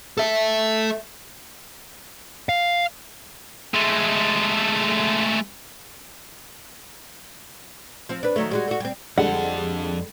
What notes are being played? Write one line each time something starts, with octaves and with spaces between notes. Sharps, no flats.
A4 E5
F5
G#3 A3
F3 C4
D4 B4
D#3 F#3 A3
G3 G#3 F#4
A3 F#4
G3 C4
F2 D3 G3 G#3 A4 F#5